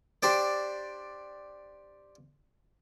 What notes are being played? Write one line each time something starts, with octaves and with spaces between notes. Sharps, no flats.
D4 G4 C5 D5